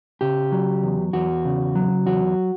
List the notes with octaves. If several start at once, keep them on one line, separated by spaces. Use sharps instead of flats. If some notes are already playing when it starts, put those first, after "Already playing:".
C#3 G4
F#3
E2
E2 F#4
C#3
F#3
E2 F#4